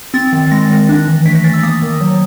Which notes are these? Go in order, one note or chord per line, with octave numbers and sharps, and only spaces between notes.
C4 A6
D#3
G#3 A#6
D#3
D4
E3
A3 B6
A#6
E3 A6
E6
A#3 D#6
D#3
F#3